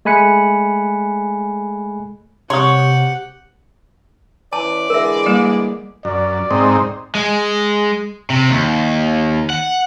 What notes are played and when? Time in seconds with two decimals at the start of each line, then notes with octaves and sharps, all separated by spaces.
0.05 G#3 A3 G#5 B5 F#6 C#7
2.50 C3 G4 C#5 F#5 C6 C#6 D#6
4.53 E3 C#4 B4 D5 A5
4.90 D3 E3 G#3 A#4 E5
5.26 G3 A#3
6.05 F#2 D5
6.51 G#2 C4 D#4
7.15 G#3
8.30 C3
8.50 D#2
9.50 F#5